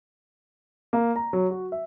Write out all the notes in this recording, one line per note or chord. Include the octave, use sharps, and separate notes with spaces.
A#3
A#5
F#3
F#4
E5